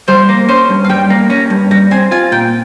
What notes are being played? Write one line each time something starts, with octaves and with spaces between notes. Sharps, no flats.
G3 C5
A#3
C#4 C5
G2
F5
G3 G5
A#3
C#4 A#5
G2
G3 A#5
C4 G#5
F4 G#5
A#2 G5